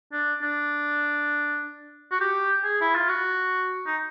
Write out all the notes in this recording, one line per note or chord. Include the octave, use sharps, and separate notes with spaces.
D4
D4
F#4
G4
G#4
E4
F4
F#4
D#4